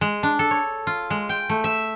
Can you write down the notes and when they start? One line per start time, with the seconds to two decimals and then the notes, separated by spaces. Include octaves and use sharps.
0.01 G#3
0.23 D4
0.39 A4
0.51 C#5
0.87 F4
1.10 G#3
1.29 G5
1.49 A3
1.64 E5